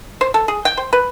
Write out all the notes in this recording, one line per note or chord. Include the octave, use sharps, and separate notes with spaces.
C5
A4
G#4
G5
C5
B4